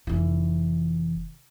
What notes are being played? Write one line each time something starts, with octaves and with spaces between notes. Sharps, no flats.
F1 E3